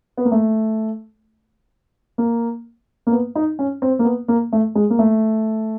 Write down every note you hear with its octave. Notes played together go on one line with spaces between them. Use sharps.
B3
A#3
A3
A#3
A#3
B3
D#4
C#4
C4
A#3
B3
A#3
A3
G#3
A#3
A3